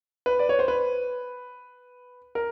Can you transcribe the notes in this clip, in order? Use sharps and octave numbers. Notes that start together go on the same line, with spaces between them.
B4
D5
C#5
C5
B4
A#4